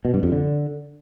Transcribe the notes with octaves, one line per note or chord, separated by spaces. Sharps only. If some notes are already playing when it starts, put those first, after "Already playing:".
B2
G2
F2
D3